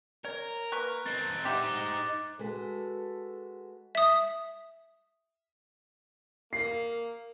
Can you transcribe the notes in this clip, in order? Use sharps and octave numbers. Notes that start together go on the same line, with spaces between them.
A#4 C#5
A#3 B4 C#6 F#6
C4 D#4 A6
D#4 G4 C5 E5 F#5 D6
G#3 F#4 A4 B4
E5 D#6
A#3 C7